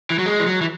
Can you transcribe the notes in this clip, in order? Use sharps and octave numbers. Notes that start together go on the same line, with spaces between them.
E3
F#3
G#3
E3
F#3
E3